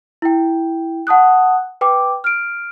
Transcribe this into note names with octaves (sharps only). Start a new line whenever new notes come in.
E4 G5
F#5 A5 D#6 F#6
B4 G5 D6
F6 D7